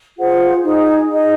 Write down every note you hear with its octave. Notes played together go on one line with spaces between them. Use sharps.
F4 G#4 C5 F#5
D#4 G#4 D#5
D#4 G#4 D#5